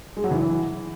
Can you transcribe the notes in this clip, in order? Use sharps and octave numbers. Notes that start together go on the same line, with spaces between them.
G#3
F#3
E3